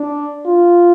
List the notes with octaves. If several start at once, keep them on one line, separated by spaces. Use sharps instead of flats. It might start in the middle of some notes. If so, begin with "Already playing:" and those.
Already playing: D4
F4